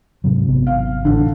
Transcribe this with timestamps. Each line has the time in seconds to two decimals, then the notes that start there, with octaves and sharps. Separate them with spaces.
0.24 G#2 C3 F#3
0.47 G#1 C3 B3
0.67 F5
1.05 A1 D3